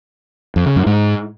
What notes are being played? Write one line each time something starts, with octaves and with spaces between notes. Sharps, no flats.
F2
C#3
F#2
G#2